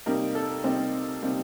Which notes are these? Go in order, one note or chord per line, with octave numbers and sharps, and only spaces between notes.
C3 G3 A#3 D#4 A#4
A4
C3 G3 A#3 C4 D#4 C5
C3 G3 A#3 D#4